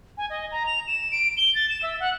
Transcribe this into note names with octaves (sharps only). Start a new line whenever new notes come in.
G#5
D#5
A#5
F7
E7
D7
G7
A6
E7
E5
F#5